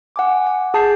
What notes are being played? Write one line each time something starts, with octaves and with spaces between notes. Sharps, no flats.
F#5 G#5 D6
F#5
G#4 A5 G6 C7